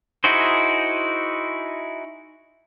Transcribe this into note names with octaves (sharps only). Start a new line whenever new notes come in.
D#4 E4 F#4 G#4 C5